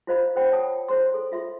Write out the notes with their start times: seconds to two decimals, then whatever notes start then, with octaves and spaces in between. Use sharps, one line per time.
0.07 E4 F4 C5 D#5 F5 B5
0.36 C5 F#5 G5 B5
0.52 C#5 G5 A5 D#6
0.88 E4 C5 C6
1.14 A4
1.32 F4 E5 C6